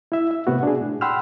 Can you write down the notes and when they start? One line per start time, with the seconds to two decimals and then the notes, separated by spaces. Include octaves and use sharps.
0.12 E4 E5
0.31 E5
0.47 A2 C3 B3 F#4
0.63 D4 G#4
0.81 A2
1.01 F#5 G5 B5 C6 E6 F6